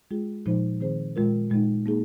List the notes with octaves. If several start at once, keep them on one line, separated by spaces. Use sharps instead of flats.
G#3 F4 G#4
A#2 F3 G#3 D#4 C5
D#3 C4 G#4 C5
A#2 G#3 F4 A#4
A#2 G#3 D#4
A#3 D#4 G#4